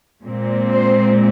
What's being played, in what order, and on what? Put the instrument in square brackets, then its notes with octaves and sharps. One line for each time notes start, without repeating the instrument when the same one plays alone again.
[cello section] A#2 G#3 C4
C5